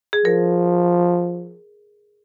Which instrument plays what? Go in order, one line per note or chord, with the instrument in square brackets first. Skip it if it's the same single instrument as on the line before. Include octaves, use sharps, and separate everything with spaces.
[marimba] G#4
[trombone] F3 [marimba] A#4